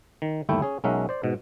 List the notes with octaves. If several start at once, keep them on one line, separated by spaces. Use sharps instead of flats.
D#3
G1 D#2 A3 E4 G5
C#4 G#4
B1 G#3 C#4 A#4 E5 F#5
C5 D5
G#2 B2